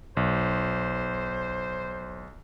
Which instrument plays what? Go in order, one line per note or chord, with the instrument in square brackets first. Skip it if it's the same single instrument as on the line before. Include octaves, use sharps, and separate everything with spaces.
[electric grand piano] B1 [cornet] C5